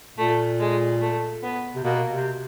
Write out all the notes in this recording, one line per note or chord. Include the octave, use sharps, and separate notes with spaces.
A#2 A3
G#3
A3
B3
C3
B2 A#3
C3